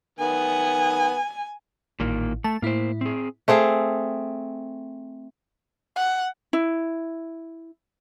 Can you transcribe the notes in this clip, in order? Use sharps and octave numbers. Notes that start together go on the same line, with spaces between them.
D#3 B3 G#5
A1 A#2 D#3 A#3
A3 A5
A2 A#3 E4 C5
C4 G#4
A3 C4 G#4 F5
F#5
E4